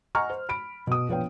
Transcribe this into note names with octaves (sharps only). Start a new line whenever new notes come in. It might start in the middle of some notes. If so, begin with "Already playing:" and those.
D#5 F#5 G#5 A#5 C#6 F6
C5
B5 D7
B2 D#6
A#1 F3 B3 C#5 F5 G5